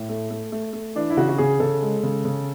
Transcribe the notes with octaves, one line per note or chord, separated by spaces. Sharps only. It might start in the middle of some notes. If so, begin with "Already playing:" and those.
Already playing: A2
A3
A3
A3
A3
E3 D4
E4
C#3 F#4
F#4
C#3 G#4
C#3 A4
G#3
C#3
C#3